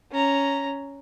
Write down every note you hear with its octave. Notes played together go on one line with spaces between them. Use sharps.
C#4 A#5